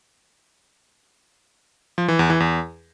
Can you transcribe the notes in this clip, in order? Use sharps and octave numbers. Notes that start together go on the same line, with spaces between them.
F3
E3
E2
E3
E2